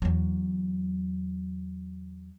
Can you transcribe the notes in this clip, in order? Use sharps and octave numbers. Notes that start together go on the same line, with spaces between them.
E2 F#3